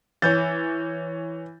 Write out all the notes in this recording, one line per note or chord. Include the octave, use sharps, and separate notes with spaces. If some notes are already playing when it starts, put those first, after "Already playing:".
E3 C#5 G6 A6